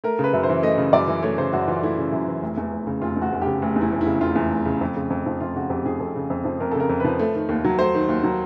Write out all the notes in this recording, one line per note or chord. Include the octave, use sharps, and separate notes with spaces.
A3 A#4
C#3 B4
F#2
C5
E3
A3 D#5
C#3
F#2 D5
E3
A3 C#5
C#3 C5
F#2 F#4
E3 F4
A3 E4
C#3
F#2
E3
F1
E2
F1
C#3
F1 F4
E2
F#4
F1
C#3 G4
F1
E2 E4
F1
E4
C#3
F1 F4
E2
F1
C#3
F2
C#3
F2
F3
F2 F4
C#3 F#4
F2 G4
F3 G#4
F2 A4
C#3
F2
F3
F2 A#4
A4
C#3
A#4
F2
F3 B4
A3
D#3
D#2
F#3
A3 C5
D#3
D#2
F#3